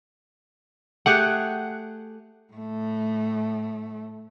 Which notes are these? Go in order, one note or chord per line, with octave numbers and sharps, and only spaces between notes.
A3 G4 G#4 F#5
A2 A3